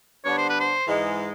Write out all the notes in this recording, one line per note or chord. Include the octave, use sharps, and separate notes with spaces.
D3 G3 B3 D4 C#5
C5
B4
C5
G#2 E3 G#3